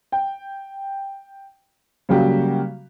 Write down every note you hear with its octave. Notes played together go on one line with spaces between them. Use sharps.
G5
C#3 F#3 G3 A#3 F#4 G4